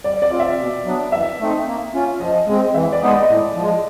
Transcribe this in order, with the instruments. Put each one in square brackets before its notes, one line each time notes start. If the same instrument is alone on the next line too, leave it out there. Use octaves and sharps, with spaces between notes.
[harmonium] G3 [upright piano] D5
[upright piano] D5
[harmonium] C4 F4
[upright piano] E5
[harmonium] B2
F#3 B3 D4
[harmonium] E3 [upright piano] E5
[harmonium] A3 C4 D#4
A#3
C#4 F4
[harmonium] F3 [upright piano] D#5
[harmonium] G#3 [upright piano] D#5
[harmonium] C4
[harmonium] E3 [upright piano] E5
[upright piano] D5
[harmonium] G#3 B3 D#4
[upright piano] D#5
[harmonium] A2
F3 G#3